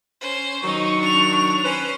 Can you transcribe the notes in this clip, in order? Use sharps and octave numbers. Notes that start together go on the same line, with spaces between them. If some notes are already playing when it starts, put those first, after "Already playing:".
C#4 C5
D#3 F#3 D#4 C#6
D4 F7
C#4 B4 C5